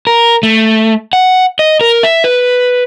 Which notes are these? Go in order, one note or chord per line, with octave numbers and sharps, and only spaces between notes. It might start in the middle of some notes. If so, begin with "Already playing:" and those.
A#4
A3
F#5
D#5
A#4
E5
B4